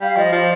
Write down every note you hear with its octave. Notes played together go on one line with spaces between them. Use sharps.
G3 F5
F3 D#5
F3 D5